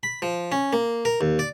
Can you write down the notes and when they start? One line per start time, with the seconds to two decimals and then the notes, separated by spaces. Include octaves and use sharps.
0.03 B5
0.22 F3
0.52 C#4
0.73 A#3
1.05 A#4
1.21 D#2
1.39 D5